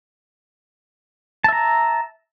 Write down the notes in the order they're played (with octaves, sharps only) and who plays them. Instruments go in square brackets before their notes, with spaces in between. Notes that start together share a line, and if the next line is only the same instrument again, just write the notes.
[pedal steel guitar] A5
E5
A#5